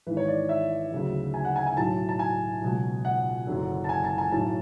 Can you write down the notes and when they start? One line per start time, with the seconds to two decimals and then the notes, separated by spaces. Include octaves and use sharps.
0.07 G#1 G#2 E3 B4
0.17 C#5
0.28 D5
0.49 E5
0.92 D2 C#3 F#3
1.34 G#5
1.45 F#5
1.56 G#5
1.67 G#5
1.77 B1 A2 F#3 A5
2.09 A5
2.19 G#5
2.62 C#2 B2 F#3
3.05 F#5
3.47 F#1 F#2 D3 F#3
3.84 A5
3.89 G#5
4.04 A5
4.18 G#5
4.32 B1 A2 F#3 A5